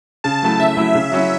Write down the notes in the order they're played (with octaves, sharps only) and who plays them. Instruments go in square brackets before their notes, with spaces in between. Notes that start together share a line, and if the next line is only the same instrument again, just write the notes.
[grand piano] C#3 [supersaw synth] A5
[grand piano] F#3 A3 E4
[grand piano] C#3 [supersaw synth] E5
[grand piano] F#3 A3 E4
C#3
F#3 C#4 E4